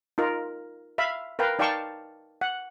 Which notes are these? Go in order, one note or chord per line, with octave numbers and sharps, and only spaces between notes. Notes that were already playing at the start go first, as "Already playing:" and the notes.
D#4 F4 A#4
E5 F5 B5
A#4 B4 F5 G5
D#4 D5 F5 G5 A5 C#6
F#5